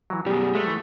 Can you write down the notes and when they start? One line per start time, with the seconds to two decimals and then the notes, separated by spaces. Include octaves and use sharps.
0.10 E3 F#3
0.26 F#2 B2 G3 G4 G#4
0.55 G#3 A3 A#4 C#5
0.67 E3